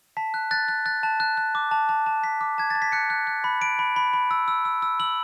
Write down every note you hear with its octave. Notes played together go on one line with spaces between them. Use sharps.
A5 B6
F#6
F#6 A6
F#6
F#6 A6
A5
F#6
F#6
D6
A5
A5
A5
A5 B6
D6
A5 G#6
A5 A6
B6
F#6 C#7
F#6
F#6
B5
B5 D7
B5
B5
B5
E6
E6
E6
E6
E6 F#7